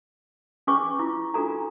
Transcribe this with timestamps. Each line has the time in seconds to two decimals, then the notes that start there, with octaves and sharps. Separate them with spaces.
0.67 C#4 G#4 B4 G#5 C#6 D6
0.99 E4 F4
1.34 D4 F4 F#4 A4 A#5